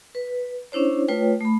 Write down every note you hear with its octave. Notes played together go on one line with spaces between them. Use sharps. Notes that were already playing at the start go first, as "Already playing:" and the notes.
B4
C#4 D4 E4 C5 C#5
A3 F4 B4 C#5 G5
A3 B5